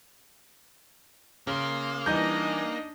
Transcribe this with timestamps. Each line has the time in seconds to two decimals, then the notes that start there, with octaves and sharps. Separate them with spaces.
1.47 C#3 A#3 C6
2.06 E3 G3 D4 D#4 D#5 G6